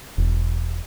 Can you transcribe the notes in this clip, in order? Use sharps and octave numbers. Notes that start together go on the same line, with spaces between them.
E1